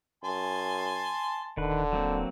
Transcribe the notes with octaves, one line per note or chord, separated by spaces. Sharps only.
F#2 G#5 A5 C6
D#1 D3 D#3 B4
F#3 A#3 C4